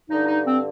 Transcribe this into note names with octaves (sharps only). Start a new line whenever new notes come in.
G2 D3 D#4
D#4
C4